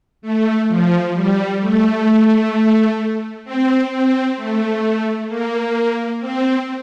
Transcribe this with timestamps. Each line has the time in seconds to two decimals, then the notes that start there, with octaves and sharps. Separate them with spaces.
0.22 A3
0.68 F3
1.14 G3
1.60 A3
3.45 C4
3.90 C4
4.37 A3
5.29 A#3
6.20 C4